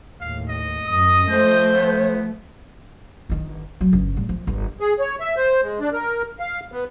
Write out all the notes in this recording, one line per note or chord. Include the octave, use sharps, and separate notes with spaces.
D#2 A2 F5
D#5
F#2 D#6
F3 A3 C5 G6
B3
G1 D#3
F#3
G1 C#3
A2 G3
F3
G1
G#4
C#5
E5
C5
G#3
D4
A#4
F5
B3